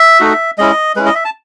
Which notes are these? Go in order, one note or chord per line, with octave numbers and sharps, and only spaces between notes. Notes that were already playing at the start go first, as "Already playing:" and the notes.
Already playing: E5
A3 D#4 F#4
G#3 C#4 E4 D#5
G#3 C#4 E4 B4
D#5
E5
A5